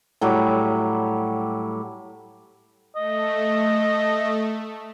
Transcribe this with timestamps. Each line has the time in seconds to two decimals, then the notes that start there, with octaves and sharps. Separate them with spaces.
0.21 A2 F#3 G3 G4
2.96 A3 D#5